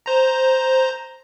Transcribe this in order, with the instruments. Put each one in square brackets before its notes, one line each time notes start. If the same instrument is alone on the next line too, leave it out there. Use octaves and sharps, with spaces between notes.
[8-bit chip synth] C5 A#5